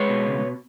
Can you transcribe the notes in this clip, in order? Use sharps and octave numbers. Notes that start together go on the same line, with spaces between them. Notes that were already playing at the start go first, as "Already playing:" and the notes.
Already playing: G#3 B4 C#5
B2
C#2